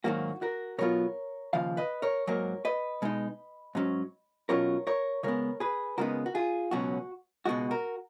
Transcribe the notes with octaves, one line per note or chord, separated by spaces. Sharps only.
G#2 D#3 F#3 A#3 F#4
F#4 A#4
B2 F#3 B3 F4 A#4 C#5
D#2 C#3 F3 F5
B4 D#5
A#4 C#5
G#2 F#3 A#3 A#4 C#5
B4 D#5
B2 G#3 D#4
G#2 F#3 C#4
B2 F#3 C#4 F4 A#4 C#5
A#4 C#5
C#3 G#3 B3 A#4 C#5
G#4 B4
C#2 C#3 G#3 B3 D#4 F#4 A#4
F#4
F4 G#4
C#2 B2 F#3 C#4 F#4
C#2 B2 G#3 F#4
F#4 A#4